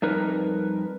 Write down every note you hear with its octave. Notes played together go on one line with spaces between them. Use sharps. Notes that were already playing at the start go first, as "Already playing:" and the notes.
F2 G3 D#4 A#4 B4